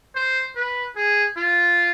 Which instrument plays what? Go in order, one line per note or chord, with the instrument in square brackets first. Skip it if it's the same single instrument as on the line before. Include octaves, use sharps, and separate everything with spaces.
[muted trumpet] C5
B4
G#4
F4